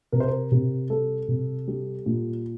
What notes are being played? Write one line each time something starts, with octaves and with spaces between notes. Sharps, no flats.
C3 A#4
C5
A#4
C3
G3 A4
C3
G3
A#2